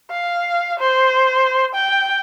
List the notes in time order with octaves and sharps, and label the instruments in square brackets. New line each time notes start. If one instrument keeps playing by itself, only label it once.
[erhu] F5
C5
G5